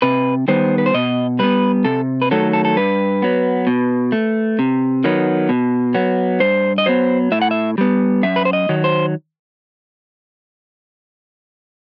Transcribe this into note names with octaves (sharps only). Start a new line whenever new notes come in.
C3 B4
D#3 G3 B3 C5
B4
C5
B2 D#5
G3 B3 B4
C3 A4
B4
D#3 F#3 A3 A4
A4
A4
G2 B4
F#3 B3
B2
A3
C3
D#3 F#3 B3
B2
F#3 B3
G2 C5
D#5
F#3 B3 C5
A2 E5
F#5
E5
G3 B3
F#2 E5
B4
C5
D#5
D#3 F#3
C5